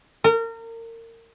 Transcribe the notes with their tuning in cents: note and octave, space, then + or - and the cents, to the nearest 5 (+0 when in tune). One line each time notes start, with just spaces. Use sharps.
A#4 -30